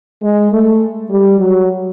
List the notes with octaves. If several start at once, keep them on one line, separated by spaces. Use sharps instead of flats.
G#3
A3
G3
F#3